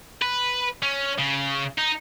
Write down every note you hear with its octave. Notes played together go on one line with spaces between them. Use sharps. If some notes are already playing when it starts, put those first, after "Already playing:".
B4
C#4
C#3
D#4